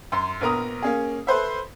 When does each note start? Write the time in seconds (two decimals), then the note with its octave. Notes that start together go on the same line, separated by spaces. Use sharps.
0.12 F#2 C6
0.41 A#1 B3 A#4 A#5 D#6
0.82 A#3 C#4 G#4
1.27 A4 B4 C5 E5